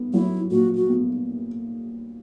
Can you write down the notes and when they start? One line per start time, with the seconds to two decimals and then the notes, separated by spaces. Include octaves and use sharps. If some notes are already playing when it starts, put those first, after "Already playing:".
Already playing: B3
0.13 F#3 E4
0.51 A#2 F#4
0.76 F#4
0.89 B3